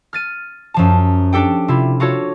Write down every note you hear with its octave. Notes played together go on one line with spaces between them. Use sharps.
F6 A6 D#7
F#2 F3 A5
D4 G4 A4 G5
C3 E4 F4
F4 F#4 A4 C#5